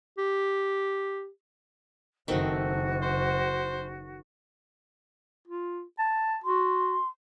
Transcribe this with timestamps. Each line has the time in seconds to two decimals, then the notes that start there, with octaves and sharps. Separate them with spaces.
0.18 G4
2.28 F#1 D#3 A3 C4 F#4
3.03 C5
5.48 F4
5.99 A5
6.44 F#4 C6